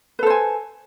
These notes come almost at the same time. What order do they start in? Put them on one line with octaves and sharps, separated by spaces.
B4 A4 C5 G#5